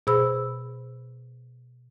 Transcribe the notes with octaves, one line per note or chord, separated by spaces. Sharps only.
B2 G#4 C5 B5 E6